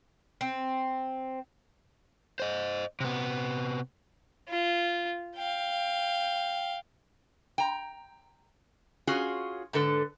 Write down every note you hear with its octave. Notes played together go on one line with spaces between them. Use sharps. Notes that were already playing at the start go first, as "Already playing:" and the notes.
C4
C5 D#5
C3 B3
F4
F5 G5
G5 A#5
C#4 F4 F#4 G#4
G#2 D3 A4 B4